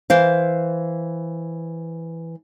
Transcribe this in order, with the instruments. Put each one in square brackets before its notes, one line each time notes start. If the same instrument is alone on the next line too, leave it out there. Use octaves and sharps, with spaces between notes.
[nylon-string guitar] E3 C5 F5